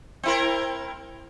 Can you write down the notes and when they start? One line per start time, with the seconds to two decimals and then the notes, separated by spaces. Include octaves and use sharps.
0.23 C4 E4 A#4